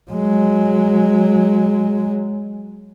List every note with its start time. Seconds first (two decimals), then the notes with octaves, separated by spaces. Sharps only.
0.11 F#3 G#3